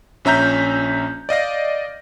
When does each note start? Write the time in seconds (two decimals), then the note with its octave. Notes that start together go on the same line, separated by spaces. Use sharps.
0.25 A#1 C#4 E5 A#5 G6
1.29 D5 D#5 F5 A#6